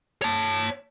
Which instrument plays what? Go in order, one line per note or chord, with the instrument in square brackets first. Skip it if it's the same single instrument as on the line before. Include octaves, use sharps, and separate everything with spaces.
[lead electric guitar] C#5 A5